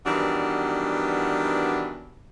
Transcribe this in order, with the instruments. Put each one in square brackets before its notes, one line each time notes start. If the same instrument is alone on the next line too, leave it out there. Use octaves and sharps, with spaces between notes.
[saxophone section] D#3 E3 F#3 G3 B3 D4